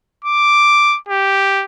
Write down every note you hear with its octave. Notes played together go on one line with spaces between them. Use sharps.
D6
G4